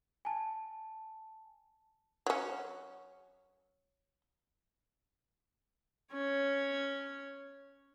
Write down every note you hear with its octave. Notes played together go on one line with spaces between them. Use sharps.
G#5 A5
F#3 C#4
C#4 C#5